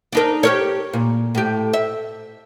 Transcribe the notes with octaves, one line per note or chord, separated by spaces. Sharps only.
D4 D#4 A#4
G4 A#4 C#5
A#2
A2 G4
E5